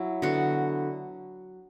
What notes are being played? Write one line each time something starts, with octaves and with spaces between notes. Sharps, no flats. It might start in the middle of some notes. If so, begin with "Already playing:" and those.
Already playing: F#3 E4
D3 B3 F#4